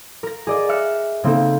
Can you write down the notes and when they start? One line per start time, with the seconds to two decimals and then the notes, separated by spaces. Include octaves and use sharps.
0.23 A#4 A#6
0.47 G#4 D5 D#5
0.69 E5 F6 F#6 C#7
1.24 C#3 A#3 C4 D#4 A4